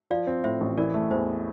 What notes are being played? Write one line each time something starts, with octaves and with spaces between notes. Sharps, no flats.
F3 D5 F5
C4
A2 C5 E5
A1
E3 A#4 D5
A3
E2 C5